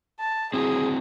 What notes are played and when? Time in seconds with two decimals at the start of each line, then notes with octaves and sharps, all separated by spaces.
0.20 A5
0.54 C4 E4 F#4 G#4